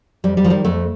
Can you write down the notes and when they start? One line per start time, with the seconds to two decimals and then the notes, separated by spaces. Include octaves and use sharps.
0.24 F2 G3
0.37 G3
0.44 D#3 F3
0.50 G3
0.65 F2 A3